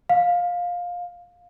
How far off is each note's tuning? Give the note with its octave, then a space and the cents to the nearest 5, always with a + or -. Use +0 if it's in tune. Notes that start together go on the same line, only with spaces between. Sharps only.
F5 +15